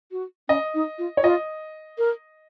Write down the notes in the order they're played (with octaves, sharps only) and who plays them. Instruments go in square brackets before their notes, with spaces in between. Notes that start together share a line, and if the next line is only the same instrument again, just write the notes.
[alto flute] F#4
[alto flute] C#4 [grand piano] D#5
[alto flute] D#4
F4
[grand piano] C#5
[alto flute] F4 [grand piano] D#5
[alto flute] A#4